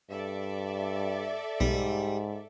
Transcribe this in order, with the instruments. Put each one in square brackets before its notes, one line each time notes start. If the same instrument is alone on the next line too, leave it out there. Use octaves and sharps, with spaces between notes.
[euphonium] G2 [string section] A4 D5 E5
[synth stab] B1 [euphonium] G#2 [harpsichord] G3